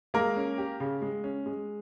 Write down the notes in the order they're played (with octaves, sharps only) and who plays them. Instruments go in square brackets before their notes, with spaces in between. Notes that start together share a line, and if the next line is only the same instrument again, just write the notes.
[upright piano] G#3 [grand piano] A#3 A#4
[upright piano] C#4
G4
C#3
G#3
C#4
G#3